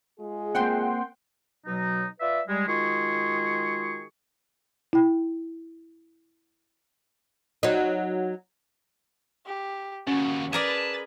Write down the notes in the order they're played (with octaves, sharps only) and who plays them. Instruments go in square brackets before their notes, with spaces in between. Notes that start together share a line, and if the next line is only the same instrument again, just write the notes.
[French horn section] G#3 F4 G#4
[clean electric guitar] A#3 C4 [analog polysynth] F#5 G5 C6
[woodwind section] B2 F#3 D#4
F4 B4 D5 E5
G3 G#3
D#3 G#3 F4 F#4 G#4 C#6
[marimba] E4 G5
[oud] F#3 D#4
[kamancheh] G4
[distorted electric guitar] D#2 C#3 [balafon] C#4 [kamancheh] F#4
[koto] G#4 A#4 D5 [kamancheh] B4 [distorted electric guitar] A5